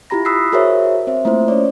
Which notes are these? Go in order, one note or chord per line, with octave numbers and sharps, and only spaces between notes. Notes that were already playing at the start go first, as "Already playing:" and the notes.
E4 F4 G4 A#5 B5 A#6
B5 D#6 E6 F#6 B6 C7
F#4 G#4 A#4 C5 C#5 E5
C4 C5 E5
A3 A#3 E4 F4 C5
C#4 C#5 D5